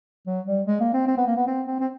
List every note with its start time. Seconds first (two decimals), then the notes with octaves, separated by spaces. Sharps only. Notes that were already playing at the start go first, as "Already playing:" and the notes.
0.27 F#3
0.47 G3
0.67 G#3
0.80 A#3
0.94 C4
1.07 C4
1.17 B3
1.27 A#3
1.36 B3
1.47 C4
1.67 C4
1.80 C4